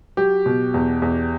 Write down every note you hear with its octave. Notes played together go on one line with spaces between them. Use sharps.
F#3 G4
B2
E2
E2